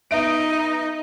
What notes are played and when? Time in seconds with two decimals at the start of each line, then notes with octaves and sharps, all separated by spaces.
0.11 B3 D#4 E5 D7